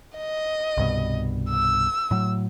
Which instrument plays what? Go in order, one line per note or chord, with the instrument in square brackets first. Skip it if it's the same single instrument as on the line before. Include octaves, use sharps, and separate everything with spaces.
[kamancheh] D#5
[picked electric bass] C2 G2 B2
[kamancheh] E6
[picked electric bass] A2 F#3